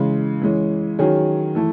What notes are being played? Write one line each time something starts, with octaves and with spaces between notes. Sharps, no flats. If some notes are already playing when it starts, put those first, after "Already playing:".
Already playing: C#3 E3 G#3
E3 G#3 C#4
D#3 F#3 C#4 G#4
E3 A3 E4